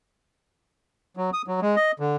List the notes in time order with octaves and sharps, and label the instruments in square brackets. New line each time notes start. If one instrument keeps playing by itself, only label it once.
[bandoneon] F#3
D#6
F#3
G#3
D#5
D3